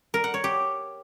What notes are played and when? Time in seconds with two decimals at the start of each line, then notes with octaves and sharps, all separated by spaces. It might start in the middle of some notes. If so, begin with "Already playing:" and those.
0.14 A#4
0.24 F#5
0.34 C#5
0.44 G4